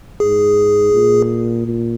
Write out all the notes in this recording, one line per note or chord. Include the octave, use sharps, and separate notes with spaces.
G#2 G#4
A#2
A#2